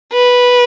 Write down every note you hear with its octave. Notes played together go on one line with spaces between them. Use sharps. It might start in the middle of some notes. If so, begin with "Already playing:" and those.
B4